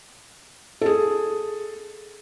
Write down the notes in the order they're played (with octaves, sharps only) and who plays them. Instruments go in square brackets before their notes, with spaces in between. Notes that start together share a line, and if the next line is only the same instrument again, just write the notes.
[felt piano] G#4 A4